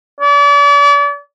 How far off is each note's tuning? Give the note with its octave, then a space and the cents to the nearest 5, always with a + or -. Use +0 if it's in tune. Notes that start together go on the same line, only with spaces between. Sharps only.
D5 -40